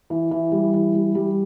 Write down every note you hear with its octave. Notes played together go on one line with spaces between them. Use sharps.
E3
E3
G3
E3
G3
G3